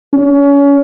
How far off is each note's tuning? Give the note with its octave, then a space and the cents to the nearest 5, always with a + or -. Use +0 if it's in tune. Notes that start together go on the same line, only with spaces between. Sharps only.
C#4 +30